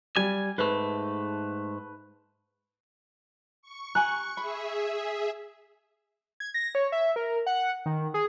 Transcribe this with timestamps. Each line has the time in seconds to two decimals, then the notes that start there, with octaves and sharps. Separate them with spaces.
0.16 G3 G#5
0.58 G#2 A3 B4
3.62 C#6
3.95 G4 G#5 A#5 F#6
4.37 G#4 E5 B5
6.40 G#6
6.54 A#6
6.75 C#5
6.92 E5
7.16 A#4
7.46 F#5
7.86 D#3
8.14 G#4